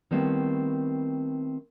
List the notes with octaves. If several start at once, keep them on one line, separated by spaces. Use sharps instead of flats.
D#3 G3 A3 B3 C4 E4